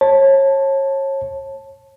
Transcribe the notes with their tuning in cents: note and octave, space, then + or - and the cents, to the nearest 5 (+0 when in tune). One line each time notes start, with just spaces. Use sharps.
C#5 -30 A5 +0